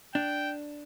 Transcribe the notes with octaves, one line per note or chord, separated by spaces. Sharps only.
D4 G5